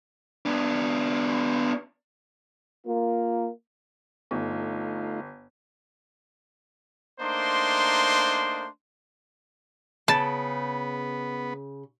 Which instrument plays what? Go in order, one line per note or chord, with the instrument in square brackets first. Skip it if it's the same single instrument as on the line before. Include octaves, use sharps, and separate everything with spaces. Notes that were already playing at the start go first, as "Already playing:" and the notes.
[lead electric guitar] B3 D4
[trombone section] A#3 F4
[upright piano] G1 [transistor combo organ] A3 D#4 F4
[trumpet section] A3 A#3 D4 D#4 C5 C6
[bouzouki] C#3 [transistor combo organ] B3 [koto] A5